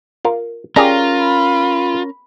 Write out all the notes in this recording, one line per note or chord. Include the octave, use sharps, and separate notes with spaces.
F4 A#4
C#4 F4 G4 G#4 A#4 D5 A#5
B5